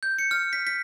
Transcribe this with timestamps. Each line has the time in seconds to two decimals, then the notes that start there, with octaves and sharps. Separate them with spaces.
0.03 G6
0.19 C#7
0.31 F6
0.53 B6
0.67 B6